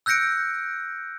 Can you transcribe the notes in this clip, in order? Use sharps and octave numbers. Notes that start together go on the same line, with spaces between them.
E6 F#6 G6 A#6 C#7 D7